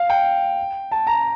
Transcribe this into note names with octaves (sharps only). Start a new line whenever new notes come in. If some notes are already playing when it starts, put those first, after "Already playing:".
Already playing: F5
G5
A5
A#5